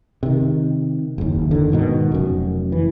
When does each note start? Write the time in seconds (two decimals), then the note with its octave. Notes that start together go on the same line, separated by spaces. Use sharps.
0.23 C3 D#3
1.18 F#1 D#2
1.51 D3 D#3
1.72 G#2 B2 D#3
2.12 F1 F#2
2.72 E3